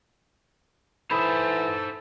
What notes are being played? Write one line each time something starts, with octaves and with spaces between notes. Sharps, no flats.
E3 D#4 A4 C5 A#5 B5 D#6